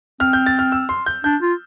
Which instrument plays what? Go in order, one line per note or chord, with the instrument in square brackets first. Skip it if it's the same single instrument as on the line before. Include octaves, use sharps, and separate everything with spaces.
[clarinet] C4 [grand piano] F6
[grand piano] G6
A6
F6
E6
C6
G6
[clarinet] D4 [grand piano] G6
[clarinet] F4